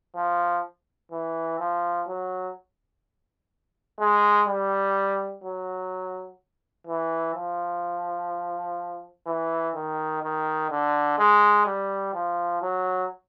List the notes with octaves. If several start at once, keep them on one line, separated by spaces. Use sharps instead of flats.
F3
E3
F3
F#3
G#3
G3
F#3
E3
F3
E3
D#3
D#3
D3
G#3
G3
F3
F#3